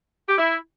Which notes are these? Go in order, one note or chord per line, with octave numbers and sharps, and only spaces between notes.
G4
E4